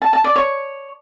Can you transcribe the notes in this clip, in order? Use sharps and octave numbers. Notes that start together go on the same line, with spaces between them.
A5
A5
D5
C#5